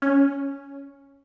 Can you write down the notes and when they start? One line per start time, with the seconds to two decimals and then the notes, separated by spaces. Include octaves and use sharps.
0.02 C#4